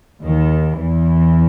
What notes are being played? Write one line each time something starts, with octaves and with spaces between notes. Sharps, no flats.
D#2 D#3
E2 E3